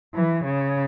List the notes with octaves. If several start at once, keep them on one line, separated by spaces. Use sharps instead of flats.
E3
C#3